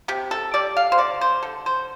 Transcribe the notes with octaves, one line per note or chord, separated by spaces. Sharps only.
C3 G4
A4
G3 D5
F5
C5
D3 D5
C5
D3 A4
C5